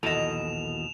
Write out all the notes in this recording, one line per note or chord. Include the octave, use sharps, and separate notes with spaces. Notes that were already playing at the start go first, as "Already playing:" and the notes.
A#1 D#2 B2 E3 A4 D#5 E7 F7